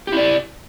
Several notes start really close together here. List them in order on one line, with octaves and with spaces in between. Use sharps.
G4 E4 D5